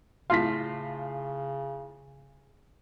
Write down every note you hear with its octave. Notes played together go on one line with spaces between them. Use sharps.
A2 C#3 F4 F5 C6 B6